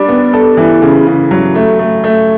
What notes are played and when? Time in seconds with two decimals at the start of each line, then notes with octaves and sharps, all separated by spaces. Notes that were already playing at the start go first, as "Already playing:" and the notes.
Already playing: G3 D4
0.08 B3
0.33 A4
0.57 E3
0.82 C#3
1.07 C#3
1.31 F#3
1.55 A3
1.79 A3
2.04 A3